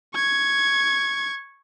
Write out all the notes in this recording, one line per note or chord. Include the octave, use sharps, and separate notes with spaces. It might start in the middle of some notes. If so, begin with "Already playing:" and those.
C#6 G#6